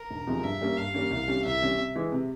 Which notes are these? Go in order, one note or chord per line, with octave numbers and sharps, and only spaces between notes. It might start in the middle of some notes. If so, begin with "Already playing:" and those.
Already playing: A#4
E1
E2 C3 F3 G#3
G2 E5
G3 A#3 C#4
G2 F5
G3 A#3 C#4
C2
C3 G3 C#4
C2 E5
C3 G3 C#4
C3
E3 G#3
C3